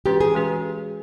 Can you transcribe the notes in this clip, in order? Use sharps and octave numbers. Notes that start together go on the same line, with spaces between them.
E3 G#3 C#4 F#4 G4 B4
G#4
E3 G#3 C#4 F#4 B4